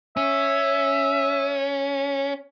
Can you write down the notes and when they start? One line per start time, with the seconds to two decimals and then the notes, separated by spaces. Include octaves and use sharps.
0.17 C#4 E5